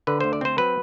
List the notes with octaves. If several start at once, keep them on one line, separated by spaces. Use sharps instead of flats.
D3 B4
D2 C5
D5
C4 C5
F#3 B4